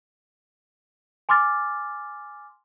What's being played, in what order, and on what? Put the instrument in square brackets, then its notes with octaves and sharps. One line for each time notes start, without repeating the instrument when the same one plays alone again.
[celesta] G#5 C6 D6 F6 A6